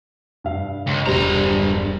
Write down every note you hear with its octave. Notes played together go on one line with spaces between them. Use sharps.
G2 F5
C#2
E1 G2 G3 C5 A#5